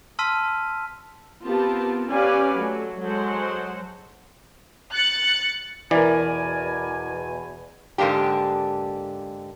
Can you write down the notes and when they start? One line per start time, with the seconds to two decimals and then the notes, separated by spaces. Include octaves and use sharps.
0.19 A5 C6 E6 F6 B6 D#7
1.45 B3 C4 F4 G4 A#4 A5
2.11 C#4 G4 B4 D5 F5 G#5
2.55 F#3 A3
3.01 F#3 G#3 A4 C5 F#5
4.92 F#6 A6 C#7
5.91 E2 B2 E3 A#4 D5 G#5
7.98 G#2 D3 A#3 D4 G4